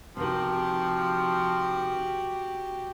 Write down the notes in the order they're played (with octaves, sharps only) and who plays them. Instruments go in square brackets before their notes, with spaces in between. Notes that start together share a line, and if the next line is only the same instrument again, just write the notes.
[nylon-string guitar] C3 D#3 [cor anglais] F3 [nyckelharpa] F#4 G4